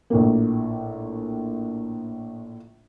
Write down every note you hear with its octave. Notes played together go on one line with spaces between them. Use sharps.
A#1 A2 A#3